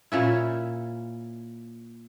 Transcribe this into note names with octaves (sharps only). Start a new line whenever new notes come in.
A#2 C#4 E4